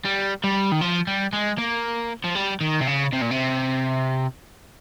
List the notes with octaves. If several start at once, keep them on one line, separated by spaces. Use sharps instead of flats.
G3
G3
D#3
F3
G3
G#3
A#3
F3
G3
D#3
C3
C#3
C3
A#2
C3